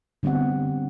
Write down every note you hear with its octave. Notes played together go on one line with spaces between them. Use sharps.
D3 G3 B3 C4 F#5